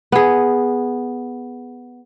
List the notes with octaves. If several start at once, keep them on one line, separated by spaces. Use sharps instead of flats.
B3 G#4